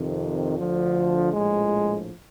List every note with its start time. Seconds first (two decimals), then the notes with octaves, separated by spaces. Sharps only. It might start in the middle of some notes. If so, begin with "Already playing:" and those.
Already playing: F2 C3 D#3
0.58 D2 D3 F3
1.34 A#1 A2 F3 G#3